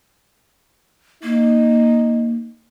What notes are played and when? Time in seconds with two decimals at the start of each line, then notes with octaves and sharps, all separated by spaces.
1.23 A#3 D#4